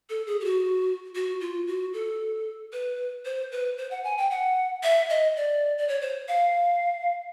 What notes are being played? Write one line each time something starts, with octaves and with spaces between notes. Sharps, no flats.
A4
G#4
G4
F#4
F#4
F4
F#4
A4
B4
C5
B4
C5
F#5
G#5
G5
F#5
E5
D#5
D5
D5
C#5
C5
F5